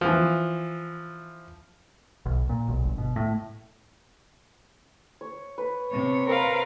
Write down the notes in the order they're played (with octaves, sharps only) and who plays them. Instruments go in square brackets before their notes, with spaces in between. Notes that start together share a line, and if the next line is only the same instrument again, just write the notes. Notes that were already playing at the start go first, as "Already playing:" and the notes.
[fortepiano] E3 F3
[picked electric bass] B1
A#2
B1
G1
B2
A2
[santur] C#5
B4
[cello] C3 C#5
[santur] C4 [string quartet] A#4 B4 F5